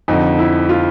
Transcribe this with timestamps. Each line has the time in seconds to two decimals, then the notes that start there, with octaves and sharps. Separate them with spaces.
0.08 F2 D3 D#4
0.39 E4
0.69 F4